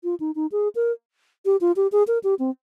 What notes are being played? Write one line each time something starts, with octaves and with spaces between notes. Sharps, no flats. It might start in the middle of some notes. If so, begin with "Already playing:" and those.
F4
D#4
D#4
G#4
A#4
G4
F4
G4
G#4
A#4
G4
C4